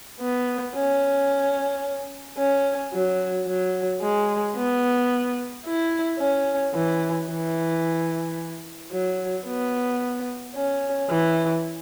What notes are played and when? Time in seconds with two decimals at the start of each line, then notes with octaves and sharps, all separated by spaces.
0.20 B3
0.74 C#4
2.38 C#4
2.93 F#3
3.47 F#3
4.01 G#3
4.56 B3
5.65 E4
6.19 C#4
6.74 E3
7.28 E3
8.92 F#3
9.47 B3
10.55 C#4
11.10 E3